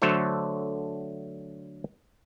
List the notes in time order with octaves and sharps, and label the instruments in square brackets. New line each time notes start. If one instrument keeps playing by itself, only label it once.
[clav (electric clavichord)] D3 F#3 A3 A4 C5 C#5